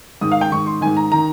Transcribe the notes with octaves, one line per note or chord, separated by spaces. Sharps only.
G#2 D#3 D#6
F5
G5
G#2 D#3 C#6
C6
G#2 D#3 G#5
A#5
D#3 A#5